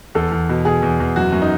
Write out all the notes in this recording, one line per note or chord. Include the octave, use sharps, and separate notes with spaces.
E2 A4
E2
B2
B2 G#4
E2
E2
F#2 F#4
F#2
D#4